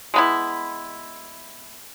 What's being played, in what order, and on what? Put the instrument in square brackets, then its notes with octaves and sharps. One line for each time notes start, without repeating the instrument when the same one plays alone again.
[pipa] G#3 B3 E4